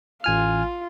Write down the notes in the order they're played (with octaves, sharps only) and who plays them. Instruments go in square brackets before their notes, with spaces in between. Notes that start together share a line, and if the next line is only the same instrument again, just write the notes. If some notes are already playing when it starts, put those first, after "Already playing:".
[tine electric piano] A1 G#5 F6 [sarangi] F4